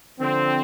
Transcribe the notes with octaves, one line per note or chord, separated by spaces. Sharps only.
D3 F3 C4